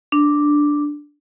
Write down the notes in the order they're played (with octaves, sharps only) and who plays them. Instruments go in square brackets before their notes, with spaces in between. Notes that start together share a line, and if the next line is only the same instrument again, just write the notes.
[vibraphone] D4